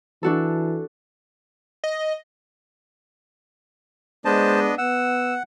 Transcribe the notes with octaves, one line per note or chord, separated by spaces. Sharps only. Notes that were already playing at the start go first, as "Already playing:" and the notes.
E3 D4 F#4 A4
D#5
G#3 B3 D4 C5 D#5 A5
B3 F#5 E6